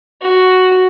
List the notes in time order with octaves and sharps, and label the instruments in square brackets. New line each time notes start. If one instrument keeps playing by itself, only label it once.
[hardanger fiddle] F#4